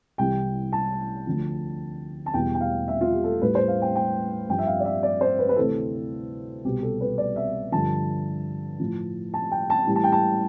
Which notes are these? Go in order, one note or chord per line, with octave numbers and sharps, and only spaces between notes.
C2 C3 E3 G3 G5
A5
D2 D3 F3
A5
E2 B2 G3 G5
G5
F5
E5
F4
G4
A4
A2 G3 B4
C5
F5
G5
G5
G2 F3 G5
E5
F5
D5
E5
D5
C5
B4
B4
D2 C3 E3 A4
C2 B2 G3 G4
A4
B4
D5
E5
G2 D3 F3 A5
A2 F3
A5
G5
A5
A2 E3 G3
A5
G5
A5